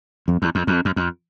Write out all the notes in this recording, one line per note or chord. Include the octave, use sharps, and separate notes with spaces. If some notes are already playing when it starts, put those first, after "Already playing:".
F2
E2
F2
F2
F#2
F2